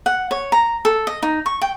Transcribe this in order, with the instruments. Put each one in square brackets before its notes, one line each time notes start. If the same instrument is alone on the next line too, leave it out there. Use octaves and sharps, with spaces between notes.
[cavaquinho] F#5
C#5
A#5
A4
D#5
D#4
C#6
G5